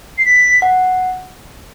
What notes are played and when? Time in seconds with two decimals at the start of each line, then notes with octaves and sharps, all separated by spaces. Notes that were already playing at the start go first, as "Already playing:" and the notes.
0.18 C7
0.25 B6
0.62 F#5